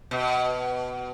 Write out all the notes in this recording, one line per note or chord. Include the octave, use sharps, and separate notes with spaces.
B2